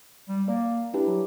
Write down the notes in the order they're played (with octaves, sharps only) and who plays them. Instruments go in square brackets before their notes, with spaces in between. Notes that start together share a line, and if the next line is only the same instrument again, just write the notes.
[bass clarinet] G3
[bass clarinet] A#3 [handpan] D5
[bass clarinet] D4 [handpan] E4 G4 B4
[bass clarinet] F#3